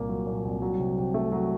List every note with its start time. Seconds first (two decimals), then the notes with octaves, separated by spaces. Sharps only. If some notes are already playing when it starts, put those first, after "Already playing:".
Already playing: C2 A#2 A#3
0.09 F#3
0.27 A#2
0.45 C2
0.62 F#3
0.79 C3
0.98 C3
1.14 A3
1.32 F#3